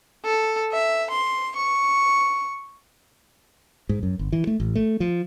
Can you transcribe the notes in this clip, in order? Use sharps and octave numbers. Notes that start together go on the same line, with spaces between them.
A4
E5
C6
C#6
G#2
F#2
G1
E3
A3
A1
A3
F3